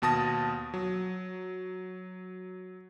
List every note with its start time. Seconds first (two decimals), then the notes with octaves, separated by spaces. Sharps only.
0.02 D#2 B2 A5 D#6 A#6
0.74 F#3